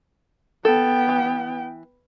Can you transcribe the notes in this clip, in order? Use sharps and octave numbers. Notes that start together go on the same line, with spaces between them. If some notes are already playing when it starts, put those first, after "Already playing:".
B3 A4 G5
E3